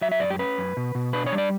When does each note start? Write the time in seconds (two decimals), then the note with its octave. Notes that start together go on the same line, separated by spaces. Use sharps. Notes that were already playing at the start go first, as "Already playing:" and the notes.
0.01 F#3 E5
0.12 E5
0.20 F#2 D5
0.30 G4
0.39 C#4 B4
0.58 F#2
0.77 B2
0.95 B2
1.13 D4 B4
1.26 C#5
1.32 G3
1.38 D5